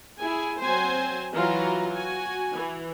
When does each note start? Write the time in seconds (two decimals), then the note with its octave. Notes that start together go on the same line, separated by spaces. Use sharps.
0.18 E4 G#4 G#5
0.61 F#3 C4 C5 G#5
1.33 E3 F#3 F4 F#4 A#5
1.92 F#4 G#5
2.53 E3